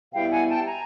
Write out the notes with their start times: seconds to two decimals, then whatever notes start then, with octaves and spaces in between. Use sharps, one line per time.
0.13 B2 G3 B3 E4 F5 G5
0.31 F#5 G#5
0.48 G5 A5
0.66 G#5 A#5